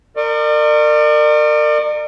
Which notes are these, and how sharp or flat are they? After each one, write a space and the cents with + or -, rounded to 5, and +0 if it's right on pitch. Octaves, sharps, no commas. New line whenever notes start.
A#4 -25 D5 +40 C#6 -25